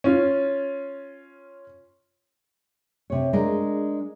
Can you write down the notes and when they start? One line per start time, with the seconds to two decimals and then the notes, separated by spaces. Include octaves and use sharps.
0.04 C#4 F4
3.10 C3 C#5
3.33 G#3 D4 A#4